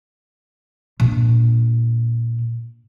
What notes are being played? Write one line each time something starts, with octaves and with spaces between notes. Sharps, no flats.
A#2 D4